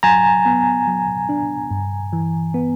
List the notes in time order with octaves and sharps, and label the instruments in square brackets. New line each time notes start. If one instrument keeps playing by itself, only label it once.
[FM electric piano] F#3 [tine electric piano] G#5 A#5
[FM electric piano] B3
F#3
D4
G2
E3
B3